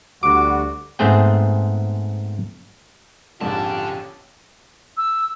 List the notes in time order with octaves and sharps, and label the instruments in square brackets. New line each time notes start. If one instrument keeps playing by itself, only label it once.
[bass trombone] D2 [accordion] G3 F#4 [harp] D6
[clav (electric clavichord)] G#2 A3 B3 C4 G#4 G5
[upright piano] A#1 F2 G#2 [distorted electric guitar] D3 A5 [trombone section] C#4 F4 G4
[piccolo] E6